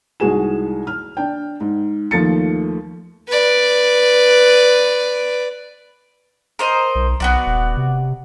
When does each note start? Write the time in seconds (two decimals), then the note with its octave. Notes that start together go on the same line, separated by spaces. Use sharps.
0.20 C2 G#2 F#4 G#4 G#5 E7
0.87 F6
1.17 D4 G5
1.60 G#2
2.11 D#2 F3 A3 A6 C#7
3.28 B4 D5
6.59 A#4 C5 D#5
6.95 B1
7.20 B1 B3 F#4 D5
7.46 D#1
7.77 C3